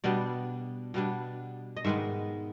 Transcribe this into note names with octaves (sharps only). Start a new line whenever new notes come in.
B2 G3 B3 D4 D5
B2 G3 B3 D4
D#5
G#2 D#3 G#3 B3 E5